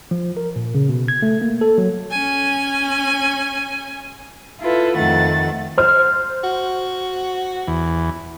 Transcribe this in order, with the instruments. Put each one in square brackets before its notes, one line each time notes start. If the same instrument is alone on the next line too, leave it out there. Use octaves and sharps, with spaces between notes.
[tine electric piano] F3
A#4
A#2
C#3
B2
G#6
A3
A#3
A4
F#3
[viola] C#4 G#5
[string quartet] E4 F4 A4 B4
F2 D#3 A3 F#5 A6
[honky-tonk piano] C5 F6
[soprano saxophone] F#4
[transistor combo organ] E2